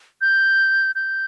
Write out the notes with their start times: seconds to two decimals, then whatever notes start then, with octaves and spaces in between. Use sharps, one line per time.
0.21 G6
0.95 G6